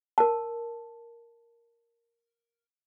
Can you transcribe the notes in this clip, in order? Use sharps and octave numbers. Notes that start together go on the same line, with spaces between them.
A#4 A5